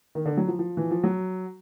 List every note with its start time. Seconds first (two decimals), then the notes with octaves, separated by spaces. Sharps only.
0.15 D#3
0.25 D3
0.37 F#3
0.48 F3
0.59 F3
0.77 E3
0.91 F3
1.04 F#3